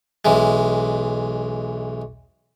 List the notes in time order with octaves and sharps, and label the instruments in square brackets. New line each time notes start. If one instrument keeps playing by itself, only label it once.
[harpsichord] B1 E3 G#3